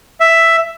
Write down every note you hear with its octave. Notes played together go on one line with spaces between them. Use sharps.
E5